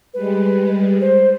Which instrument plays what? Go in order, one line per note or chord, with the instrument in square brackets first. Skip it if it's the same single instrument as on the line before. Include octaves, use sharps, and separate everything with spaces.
[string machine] G3 G#3 [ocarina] B4
[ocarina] C5